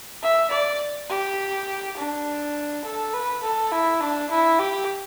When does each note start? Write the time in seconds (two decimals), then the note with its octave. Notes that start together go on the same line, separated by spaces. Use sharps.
0.22 E5
0.50 D5
1.10 G4
1.97 D4
2.84 A4
3.13 B4
3.43 A4
3.72 E4
4.00 D4
4.30 E4
4.59 G4